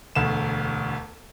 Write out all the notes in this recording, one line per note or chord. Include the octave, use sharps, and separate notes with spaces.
E1 D2 E7